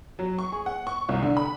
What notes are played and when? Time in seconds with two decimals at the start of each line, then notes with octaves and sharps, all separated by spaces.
0.19 F#3
0.39 C#6
0.52 G#4
0.66 F#5
0.87 C#6
1.09 C2
1.22 D3
1.37 B5